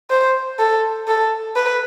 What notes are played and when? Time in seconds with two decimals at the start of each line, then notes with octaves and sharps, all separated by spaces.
0.11 C5
0.59 A4
1.07 A4
1.56 B4